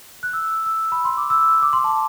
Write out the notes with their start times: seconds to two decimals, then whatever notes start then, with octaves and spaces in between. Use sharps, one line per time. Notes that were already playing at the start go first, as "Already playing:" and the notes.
0.23 F#6
0.33 E6
0.66 E6
0.92 B5
1.05 C6
1.17 D6
1.30 E6
1.63 D6
1.73 C6
1.84 A5